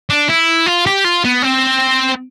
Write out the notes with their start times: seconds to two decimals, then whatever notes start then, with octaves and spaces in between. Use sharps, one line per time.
0.10 D4
0.29 E4
0.66 F4
0.86 G4
1.04 F4
1.24 B3
1.42 C4